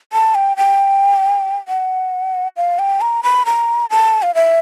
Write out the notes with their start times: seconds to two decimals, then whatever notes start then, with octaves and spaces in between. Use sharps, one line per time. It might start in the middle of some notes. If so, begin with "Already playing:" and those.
0.13 A5
0.35 G5
0.57 G5
1.68 F#5
2.57 F5
2.79 G5
3.01 A#5
3.23 B5
3.46 A#5
3.90 A5
4.22 F5
4.35 E5